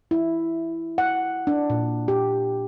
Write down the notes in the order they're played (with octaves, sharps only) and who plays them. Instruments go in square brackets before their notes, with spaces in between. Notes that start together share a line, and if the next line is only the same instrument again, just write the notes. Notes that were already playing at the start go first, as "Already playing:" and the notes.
[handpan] E4
F#5
D4
A#2
G4